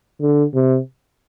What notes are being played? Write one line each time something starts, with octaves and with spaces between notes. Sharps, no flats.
D3
C3